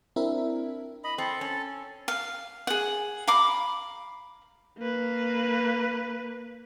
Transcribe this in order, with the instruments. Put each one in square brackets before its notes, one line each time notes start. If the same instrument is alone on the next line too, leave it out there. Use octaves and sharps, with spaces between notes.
[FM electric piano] C4 D4 E4 A#4 E5
[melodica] D#5 B5
[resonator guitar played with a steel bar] C4 [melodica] A4
[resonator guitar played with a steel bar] C#4
[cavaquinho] F5
G#4 F#5
F5 A#5 B5 D6
[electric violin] A#3 B4